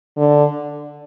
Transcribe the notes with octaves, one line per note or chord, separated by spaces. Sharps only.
D3